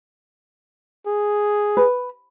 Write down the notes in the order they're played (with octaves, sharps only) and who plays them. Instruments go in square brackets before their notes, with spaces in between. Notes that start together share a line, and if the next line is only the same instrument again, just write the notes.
[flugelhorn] G#4
[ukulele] B4